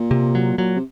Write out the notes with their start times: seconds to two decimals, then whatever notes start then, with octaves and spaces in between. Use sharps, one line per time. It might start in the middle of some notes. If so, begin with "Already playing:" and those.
Already playing: A#2
0.11 C3
0.35 F#3
0.57 A#2 F#3
0.76 C3